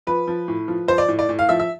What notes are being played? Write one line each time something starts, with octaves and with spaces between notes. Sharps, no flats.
F3 B4
F3
A2
F3
F3 C5
D5
A2
D5
A2
F5
F3 E5
E5